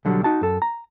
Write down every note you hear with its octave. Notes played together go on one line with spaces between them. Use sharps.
B1 D3 F#3 G3
D#4 F#4 A5
F#2 A4
A#5